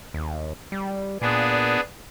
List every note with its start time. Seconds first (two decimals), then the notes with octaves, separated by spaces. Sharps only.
0.14 D#2
0.72 G3
1.22 A#2 B3 D4 G#4